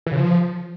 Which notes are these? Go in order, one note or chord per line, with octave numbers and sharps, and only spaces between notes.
E3
C#3
F3